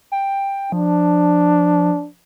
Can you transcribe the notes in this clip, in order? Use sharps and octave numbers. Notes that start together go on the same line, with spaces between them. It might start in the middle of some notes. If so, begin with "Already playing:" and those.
G5
F3 D4